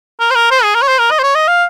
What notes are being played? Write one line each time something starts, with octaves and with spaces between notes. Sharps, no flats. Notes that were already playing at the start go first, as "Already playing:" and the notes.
A#4
C5
A#4
C5
G#4
A#4
C#5
C5
A#4
D#5
C5
C#5
D#5
F5